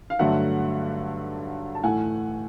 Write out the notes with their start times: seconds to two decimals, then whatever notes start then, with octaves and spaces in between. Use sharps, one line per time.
0.10 F5
0.19 G2 D3 F#3 A3 E5 F#5
1.75 A5
1.83 A2 E3 A3 F#5 G#5